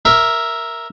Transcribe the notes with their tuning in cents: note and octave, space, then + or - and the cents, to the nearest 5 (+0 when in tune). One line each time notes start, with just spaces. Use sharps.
A#4 +0 E5 +0